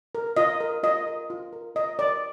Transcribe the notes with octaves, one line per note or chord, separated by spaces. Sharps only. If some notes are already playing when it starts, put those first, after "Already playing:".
A#4
F4 D#5
A#4
F4 D#5
A#4
F4
A#4
F4 D#5
A#4 D5